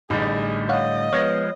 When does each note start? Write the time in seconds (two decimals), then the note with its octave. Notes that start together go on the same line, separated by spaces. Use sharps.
0.10 A1 A2 D3 G3 D#4 G#4
0.69 C#5 D#5 F5 F#5
1.13 F3 G#3 B3 C#5